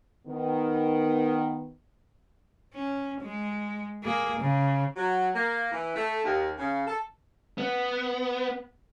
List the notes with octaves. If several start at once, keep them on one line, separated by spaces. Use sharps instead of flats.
D#3 B3
C#4
G#3
A#3 G#4
C#3
F#3
A#3
E3
A3
D#2
C#3
A4
B3